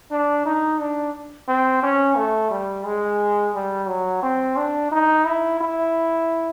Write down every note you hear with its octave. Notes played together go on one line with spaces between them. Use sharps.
D4
D#4
D4
C4
C#4
A3
G3
G#3
G3
F#3
C4
D4
D#4
E4
E4